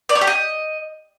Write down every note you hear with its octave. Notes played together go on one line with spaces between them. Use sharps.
D5
C#5
G4
D#5